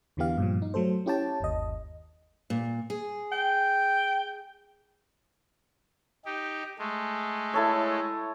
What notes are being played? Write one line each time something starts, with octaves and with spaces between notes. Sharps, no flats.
E2 D3 E3 B3 G4 F5
G2 A#2 F3
D#4
F#3 A3 A4 C5
C#4 E4 G4 C#5 G5 A5
G1 D#2 D#5
A#2
G#4
G5
D#4 G4
G#3 A3
E4 A4 C#5